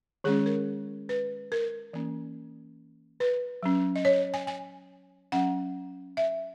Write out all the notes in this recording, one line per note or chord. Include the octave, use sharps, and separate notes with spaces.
D#3 G#3 C#4 G#4
A#4
B4
A#4
E3 A#3 C#4
B4
F#3 C#4
D#5
C#5
G#5
G#5
F#3 C#4 F#5
E5